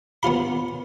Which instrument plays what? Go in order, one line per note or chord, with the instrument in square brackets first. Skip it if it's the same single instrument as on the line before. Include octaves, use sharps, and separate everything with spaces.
[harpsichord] B3 C#4 F4 B5